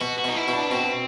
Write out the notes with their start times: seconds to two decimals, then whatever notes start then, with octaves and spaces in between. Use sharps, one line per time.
0.01 B2 F#4
0.18 F#4
0.24 B2 D#4
0.36 E4
0.48 B2
0.53 D4
0.71 B2 C4